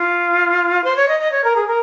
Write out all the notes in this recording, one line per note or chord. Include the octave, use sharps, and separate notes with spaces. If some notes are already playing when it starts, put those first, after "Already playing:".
Already playing: F4
C5
C#5
D#5
D#5
C#5
A#4
G#4
A#4